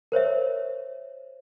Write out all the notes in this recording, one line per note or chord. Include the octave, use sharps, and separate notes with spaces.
A#4 C5 C#5 E5